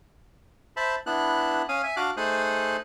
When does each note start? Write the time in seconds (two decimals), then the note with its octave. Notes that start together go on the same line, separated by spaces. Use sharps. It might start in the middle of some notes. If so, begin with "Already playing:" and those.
0.77 C5 E5 A5 B5
1.06 B3 D4 E4 F#6
1.69 C#4 F5 G#5 D#6
1.84 E5 G#5
1.97 D4 F#4 F5 D6 F#6
2.17 A3 D#4 G#4 C5 D#6 F#6